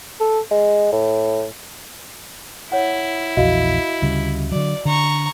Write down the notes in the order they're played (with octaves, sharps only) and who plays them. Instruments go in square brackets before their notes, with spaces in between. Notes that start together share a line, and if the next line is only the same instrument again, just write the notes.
[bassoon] A4
G#3
A2
[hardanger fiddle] E4 [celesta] C#5 F#5
[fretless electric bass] A#1 E2 [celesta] F#4 D#5 F5
[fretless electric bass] D2 C#3 G3
[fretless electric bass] D3 F#3 [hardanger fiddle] D5
[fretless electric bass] D3 [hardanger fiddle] A#5 C#6